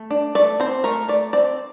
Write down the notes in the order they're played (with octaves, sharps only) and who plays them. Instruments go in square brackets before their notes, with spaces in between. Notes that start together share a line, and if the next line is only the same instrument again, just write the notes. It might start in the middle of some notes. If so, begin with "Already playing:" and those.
Already playing: [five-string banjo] A3
D4
A3 D5
C4 C5
A3 A#4
A3 D5
C4 D5